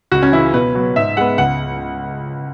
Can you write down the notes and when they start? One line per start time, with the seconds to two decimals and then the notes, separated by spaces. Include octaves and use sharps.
0.11 C#2 F#4
0.22 C#4
0.32 C#3 E3 E4
0.53 B2 B4
0.75 F#3 B3
0.96 G#2 E5
1.17 G#3 B3 F#5
1.38 C#2 F#5